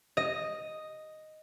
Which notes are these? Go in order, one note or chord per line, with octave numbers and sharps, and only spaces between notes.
D#5